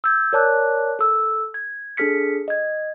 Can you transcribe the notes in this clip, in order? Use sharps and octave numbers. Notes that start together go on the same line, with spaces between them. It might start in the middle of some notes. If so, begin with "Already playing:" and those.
E6 G6 G#6
A#4 C#5 D5 A5 D6 F#6
A4 E6
G#6
D4 G#4 A4 F6 B6 C#7
D#5 G#6